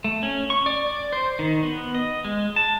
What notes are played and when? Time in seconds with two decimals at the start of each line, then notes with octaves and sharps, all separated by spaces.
0.04 A3
0.23 C#4
0.50 C#6
0.66 D5
0.87 D5
1.13 C5
1.39 D#3
1.63 B3
1.95 D#5
2.25 G#3
2.56 A5